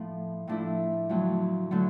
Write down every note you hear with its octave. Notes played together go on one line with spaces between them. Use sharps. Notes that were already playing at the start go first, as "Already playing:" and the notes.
Already playing: A2 F3 A3
A2 F3 A3 D4 E4
F2 D3 F#3 A3
D3 F#3 A3